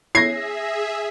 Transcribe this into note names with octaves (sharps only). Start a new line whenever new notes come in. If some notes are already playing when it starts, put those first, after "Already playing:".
E4 G#4 C#5 E5 G#6 A#6 C7